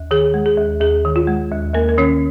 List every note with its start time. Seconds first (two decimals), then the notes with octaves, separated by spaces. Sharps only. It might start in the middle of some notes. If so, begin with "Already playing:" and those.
Already playing: D#2
0.11 D#3 G#4
0.34 G#3
0.46 G#4
0.57 D#2
0.81 D#2 G#4
1.05 D#3
1.16 F4
1.27 G#3
1.51 D#2
1.74 D#2 A#3 A#4
1.89 A#4
1.97 D#3 C#4 C#5